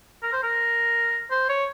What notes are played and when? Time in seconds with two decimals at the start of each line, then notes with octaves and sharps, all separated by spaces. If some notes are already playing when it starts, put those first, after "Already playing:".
0.23 A#4
0.33 C5
0.43 A#4
1.31 C5
1.49 C#5